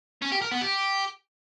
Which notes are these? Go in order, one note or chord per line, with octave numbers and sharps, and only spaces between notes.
C#4
G4
A#4
B3
G4